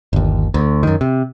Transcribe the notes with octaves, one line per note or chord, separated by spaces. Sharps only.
G1 D#2
D2
F#2 D#3
C3